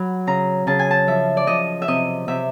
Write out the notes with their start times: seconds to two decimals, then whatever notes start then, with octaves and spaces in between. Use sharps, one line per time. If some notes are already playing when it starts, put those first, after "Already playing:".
Already playing: F#3 B5
0.27 C#3 A#5
0.67 C#3 A5
0.79 G#5
0.91 A5
1.07 F3 E5
1.37 D5
1.47 F3 D#5
1.82 E5
1.88 C3 D#5
2.28 C3 E5